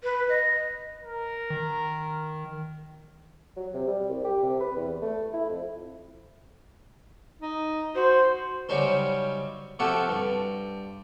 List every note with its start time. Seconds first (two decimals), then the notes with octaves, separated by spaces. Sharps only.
0.04 B4
0.29 D#5
1.03 A#4
1.50 D#3
3.56 F#3
3.74 C3
3.88 G3
4.09 C2
4.25 G4
4.43 C3
4.60 B4
4.76 E2
5.02 A3
5.33 E4
5.49 F2
7.42 D#4
7.95 F#4 C5
8.69 C#3 F#3 G3 C#4 D#4 C5
9.79 C3 F3 F#4 G4 A4 F#5
10.09 G2